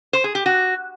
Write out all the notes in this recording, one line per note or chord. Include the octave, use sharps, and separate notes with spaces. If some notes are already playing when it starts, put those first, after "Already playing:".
C5
G#4
G4
F#4